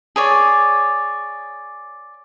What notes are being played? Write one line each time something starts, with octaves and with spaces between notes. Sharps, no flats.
G#4 C#5 D5